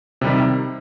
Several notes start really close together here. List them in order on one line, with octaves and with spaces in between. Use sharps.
C3 G3 D#3